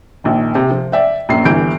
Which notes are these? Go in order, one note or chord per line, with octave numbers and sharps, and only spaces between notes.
A#1 D#3
C3
F3
D5 E5 G5
A#1 F#2 C7
G1 G2 E3 G6 D7